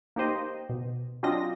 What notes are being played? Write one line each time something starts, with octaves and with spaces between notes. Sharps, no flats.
A#3 D#4 G4 C5 D#5
B2
F#3 C4 D4 F4 D#5 A#6